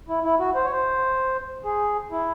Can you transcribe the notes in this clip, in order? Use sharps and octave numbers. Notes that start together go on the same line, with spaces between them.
E4
E4
F#4
C5
C#5
C5
G#4
E4